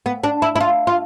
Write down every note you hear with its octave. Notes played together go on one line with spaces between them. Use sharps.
B3
D4
E4
E4
F4
F4